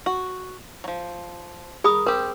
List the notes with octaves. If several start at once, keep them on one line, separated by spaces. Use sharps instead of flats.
F#4
F3 F#3
G#4 A#4 B5 D#6
C4 G4 A#4